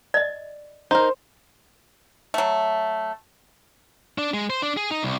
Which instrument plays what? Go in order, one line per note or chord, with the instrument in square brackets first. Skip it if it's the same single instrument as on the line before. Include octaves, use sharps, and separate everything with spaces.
[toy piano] D5 D#5
[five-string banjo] D#4 A#4 [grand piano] C5
[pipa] F#3 A3
[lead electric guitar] D4
G#3
C5
D4
G#4
D#4
C2